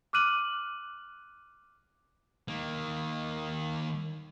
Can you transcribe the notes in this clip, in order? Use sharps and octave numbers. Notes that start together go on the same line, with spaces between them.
D6 F6 F#6 D#7 F#7
D#3 A#3